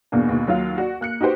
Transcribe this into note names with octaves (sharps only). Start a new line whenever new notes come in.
E2 B2 A#3 D4
D#2 B2
D#2 F#3 F4 F5
F#4 D5
A#3 F#6 C#7
D#4 F#4 G4 C5